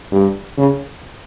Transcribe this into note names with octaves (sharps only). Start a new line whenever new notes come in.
G2
C#3